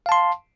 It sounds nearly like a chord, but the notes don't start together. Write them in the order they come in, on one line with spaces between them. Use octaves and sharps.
F5 A5 C6